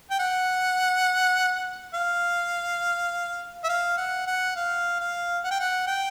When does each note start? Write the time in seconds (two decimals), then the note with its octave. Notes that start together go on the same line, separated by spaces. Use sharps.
0.11 G5
0.19 F#5
1.94 F5
3.64 E5
3.69 F5
3.97 F#5
4.27 F#5
4.56 F5
5.00 F5
5.44 F#5
5.51 G5
5.60 F#5
5.87 G5